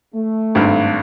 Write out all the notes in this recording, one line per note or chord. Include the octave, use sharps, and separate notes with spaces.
A3
G#1 G2